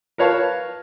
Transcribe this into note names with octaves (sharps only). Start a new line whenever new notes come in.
A#4 B4 C#5 F5 A5